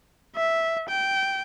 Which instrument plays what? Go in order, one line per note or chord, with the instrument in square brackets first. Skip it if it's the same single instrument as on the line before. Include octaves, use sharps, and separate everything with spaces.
[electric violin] E5
G5